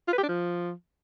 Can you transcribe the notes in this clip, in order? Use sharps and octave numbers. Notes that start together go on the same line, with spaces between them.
F4
B4
G4
D4
F3